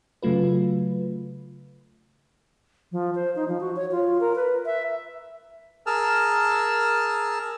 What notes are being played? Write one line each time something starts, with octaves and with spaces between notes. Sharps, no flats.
C#3 F#3 A3 F4 B4
F3
C5
D#4
F3
F#4
C#5
F4
A#4
B4
E5
G#4 A#4 A5 E6 F6